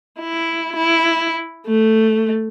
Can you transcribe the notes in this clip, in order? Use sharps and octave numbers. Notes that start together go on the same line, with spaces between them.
E4
E4
A3